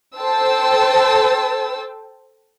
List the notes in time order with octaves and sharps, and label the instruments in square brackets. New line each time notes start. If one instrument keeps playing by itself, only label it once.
[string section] A4 C5 G5 A5 E6